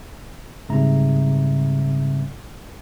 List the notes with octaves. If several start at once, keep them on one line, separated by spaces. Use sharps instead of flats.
G#2 C#3 G3 C4 E5 A#5